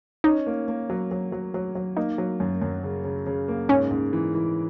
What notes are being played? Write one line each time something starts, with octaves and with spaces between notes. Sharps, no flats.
C#4 D#4
A#3
A#3
F#3
F#3
F#3
F#3
F#3
A#3 D#4
F#3
F#2
F#2
C#3
C#3
C#3
A#3
G#2 C#4
G#2
E3
E3